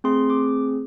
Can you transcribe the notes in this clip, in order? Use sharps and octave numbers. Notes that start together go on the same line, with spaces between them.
A3 C4 G#4 C6
D6